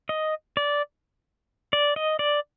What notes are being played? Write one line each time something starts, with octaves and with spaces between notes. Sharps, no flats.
D#5
D5
D5
D#5
D5